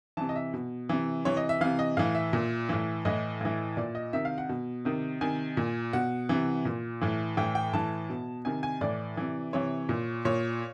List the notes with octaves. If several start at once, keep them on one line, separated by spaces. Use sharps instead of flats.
C3 E3 A5
D#5
E5
B2
C3 E3
C3 E3 C#5
D#5
E5
C3 E3 F5
D#5
A2 E3 F5
E5
A#2
A2 E3
A2 E3 D#5
A2 E3
A#2 D5
D#5
C3 D#3 E5
F5
F#5
B2
C3 D#3
C3 D#3 G#5
A#2
B2 F#5
C3 E3
A#2
A2 E3
A2 E3 G5
G5
A2 E3 A5
B2
C3 D#3 G#5
G#5
A2 E3 D5
C3 E3
C3 E3 C#5
A#2
A#2 C#5